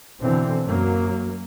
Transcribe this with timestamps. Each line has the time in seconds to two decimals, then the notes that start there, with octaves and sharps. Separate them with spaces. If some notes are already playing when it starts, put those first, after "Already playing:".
0.21 B2 D3 E3 C4
0.64 F#2 F#3 A#3